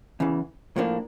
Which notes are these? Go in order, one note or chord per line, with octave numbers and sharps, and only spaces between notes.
E2 C#3 E3
A2 F3 A#3 D4